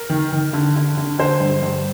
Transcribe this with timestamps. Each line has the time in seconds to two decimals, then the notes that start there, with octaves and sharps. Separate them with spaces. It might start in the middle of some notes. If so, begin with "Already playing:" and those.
Already playing: A#4
0.10 D#3
0.32 D#3
0.53 D3
0.76 D3
0.97 D3
1.19 D3 C5
1.40 G2
1.63 G2